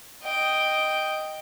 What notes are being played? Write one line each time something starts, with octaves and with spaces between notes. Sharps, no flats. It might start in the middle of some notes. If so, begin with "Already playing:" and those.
D#5 G5